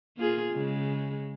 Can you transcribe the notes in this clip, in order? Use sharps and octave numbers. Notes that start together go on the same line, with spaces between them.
A#3 F4 G#4
C#3 G#3